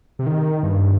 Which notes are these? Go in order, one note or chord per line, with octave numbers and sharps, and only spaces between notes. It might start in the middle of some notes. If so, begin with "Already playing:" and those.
C3
D#3
G2